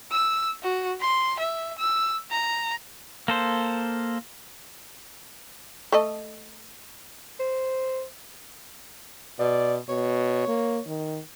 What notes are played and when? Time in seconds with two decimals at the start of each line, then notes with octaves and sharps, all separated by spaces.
0.11 E6
0.63 F#4
1.01 C6
1.39 E5
1.78 E6
2.31 A#5
3.28 A#3 A4 C5
5.92 A3 A4 D#5
7.40 C5
9.39 B2 D5
9.89 B2 C#5
10.48 A#3
10.87 D#3